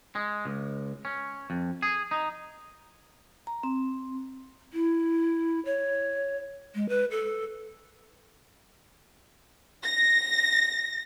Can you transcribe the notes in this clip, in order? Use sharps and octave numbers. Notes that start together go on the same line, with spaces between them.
G#3
C#2
C#4
F2
G#4
D#4
A#5
C4
E4
C#5
G#3
B4
A4
A#6